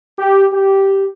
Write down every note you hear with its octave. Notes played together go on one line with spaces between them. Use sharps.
G4
G4